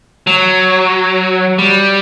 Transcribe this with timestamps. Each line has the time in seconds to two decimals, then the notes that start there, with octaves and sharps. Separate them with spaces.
0.27 F#3
1.58 G3